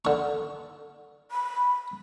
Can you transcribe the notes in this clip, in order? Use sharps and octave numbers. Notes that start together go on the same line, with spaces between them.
D3 C#6
B5